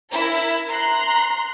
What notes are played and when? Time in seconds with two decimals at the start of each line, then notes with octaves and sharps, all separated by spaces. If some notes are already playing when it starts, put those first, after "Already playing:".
0.11 E4 A#4
0.68 A#5 C6 F#6 C7